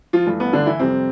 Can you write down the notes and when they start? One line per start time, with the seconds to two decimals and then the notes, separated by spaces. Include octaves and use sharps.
0.13 F3 F4
0.26 G2 E3 A3
0.40 B3
0.53 D3 D4
0.66 E3 E4
0.79 F2 C3 G3 C4